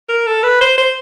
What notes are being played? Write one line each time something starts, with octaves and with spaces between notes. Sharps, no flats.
A#4
A4
B4
C5
C5